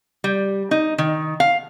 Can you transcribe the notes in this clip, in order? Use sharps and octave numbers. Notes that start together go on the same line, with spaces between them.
G3
D#4
D#3
F5